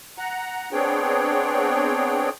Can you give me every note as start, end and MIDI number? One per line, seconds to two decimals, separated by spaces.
0.18 0.69 78
0.18 0.69 82
0.73 2.29 59
0.73 2.29 60
0.73 2.29 62
0.73 2.29 68
0.73 2.29 73
0.73 2.29 79